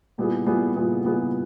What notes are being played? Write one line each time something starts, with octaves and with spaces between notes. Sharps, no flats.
A#2 G3 B3 E4 G#4
A#2 G3 B3 E4 G#4
A#2 G3 B3 E4 G#4
A#2 G3 B3 E4 G#4